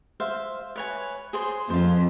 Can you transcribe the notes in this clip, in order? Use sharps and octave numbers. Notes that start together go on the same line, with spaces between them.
C5 E5 F5
B4 C#5 G#5
G#4 C5 C6
F2 F4 C5